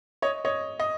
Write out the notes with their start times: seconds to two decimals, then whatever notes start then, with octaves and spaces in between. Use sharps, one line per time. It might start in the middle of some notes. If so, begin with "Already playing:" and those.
0.22 C#5 D#5
0.45 C#5 D#5
0.80 D#5